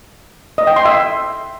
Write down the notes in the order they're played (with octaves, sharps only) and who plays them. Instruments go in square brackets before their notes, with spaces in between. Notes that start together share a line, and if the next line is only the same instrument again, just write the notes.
[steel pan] D#5
G5
C6
E5